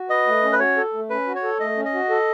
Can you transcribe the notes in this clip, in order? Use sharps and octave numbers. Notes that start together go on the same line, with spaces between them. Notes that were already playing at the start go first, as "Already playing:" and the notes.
Already playing: F#4
B4 D#5
A3
C#4
B4
F#4 C#5
A4
A3
C#4 B4
F#4
C#5
A4
A3 D#5
C#4
D#5
F#4
A4